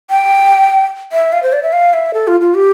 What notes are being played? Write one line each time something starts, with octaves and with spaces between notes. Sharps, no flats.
G5
E5
F5
C5
D5
E5
F5
E5
A4
F4
F4
G4